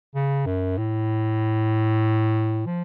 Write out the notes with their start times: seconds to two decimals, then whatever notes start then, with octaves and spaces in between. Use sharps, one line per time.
0.14 C#3
0.46 F#2
0.78 A2
2.66 F3